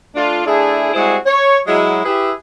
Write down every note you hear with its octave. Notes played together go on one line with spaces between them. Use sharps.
A3 D4 F4
A3 D4 E4 G#4
G3 G#3 C4 E4 F#4 G#4
C#5
F#3 G#3 E4
E4 G4 G#4 B4 E5